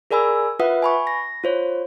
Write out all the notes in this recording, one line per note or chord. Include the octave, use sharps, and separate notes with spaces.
G#4 A#4 D5 G#5 B5 E6
F4 B4 E5 F#5 D#6
G#5 B5 C#6
A#6
F4 C5 C#5